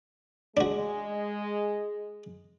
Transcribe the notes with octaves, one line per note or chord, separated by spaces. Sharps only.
G#3 D4 F#4